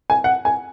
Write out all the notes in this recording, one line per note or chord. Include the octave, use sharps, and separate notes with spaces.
G#5
F#5
G#5